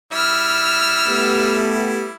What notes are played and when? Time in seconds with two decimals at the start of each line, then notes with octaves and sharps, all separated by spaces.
0.13 G3 E4 E6 F6
1.08 A3 B3 G4